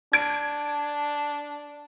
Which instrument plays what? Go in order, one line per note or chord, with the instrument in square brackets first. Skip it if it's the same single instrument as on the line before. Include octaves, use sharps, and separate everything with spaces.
[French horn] D4 [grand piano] G#6 D7